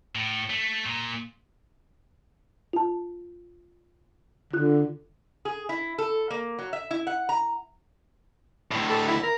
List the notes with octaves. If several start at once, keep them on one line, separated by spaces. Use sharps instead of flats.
A2
A3
A#2
F4 A5
D3 F4 F#6
G#4
E4
A4
A#3
F#3
E5
E4
F#5
A#5
D2 A2
A4
E4
A#4